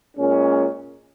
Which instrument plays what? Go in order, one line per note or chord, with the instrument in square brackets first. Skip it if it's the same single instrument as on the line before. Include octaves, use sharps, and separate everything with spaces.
[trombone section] A#2 G#3 C#4